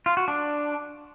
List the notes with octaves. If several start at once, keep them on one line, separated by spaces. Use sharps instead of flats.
F4
F#4
D4